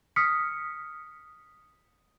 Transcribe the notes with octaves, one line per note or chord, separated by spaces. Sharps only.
D#6 F6 B6 C#7